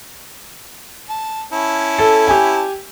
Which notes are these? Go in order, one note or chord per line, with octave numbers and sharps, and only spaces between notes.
A5
C#4 E4 A5
A4
G4 G#5